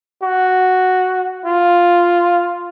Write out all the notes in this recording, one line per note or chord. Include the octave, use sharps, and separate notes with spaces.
F#4
F4